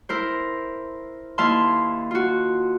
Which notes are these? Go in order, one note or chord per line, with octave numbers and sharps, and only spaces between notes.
E4 A#4 C5
D#2 E4 F5 A5 C6
F4 F#4